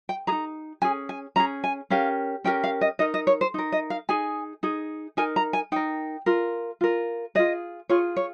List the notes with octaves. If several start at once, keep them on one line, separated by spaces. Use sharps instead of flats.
G5
D#4 G#4 A#5
C#4 G#4 G#5
G#5
C#4 G#4 A#5
G#5
C#4 G4 A#4 F5
C#4 G4 A#4 G5
F5
D#5
D#4 A#4 D#5
D#5
C#5
C5
D#4 A#4
D#5
F5
D#4 G#4 G#5
D#4 G#4
D#4 A#4 G#5
A#5
G#5
D#4 A#4 G5
F4 A#4
F4 A#4
F4 G#4 D#5
F4 G#4 C#5
C#5